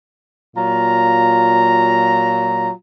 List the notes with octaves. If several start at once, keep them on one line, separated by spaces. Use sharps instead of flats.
A#2 F#3 F4 A#5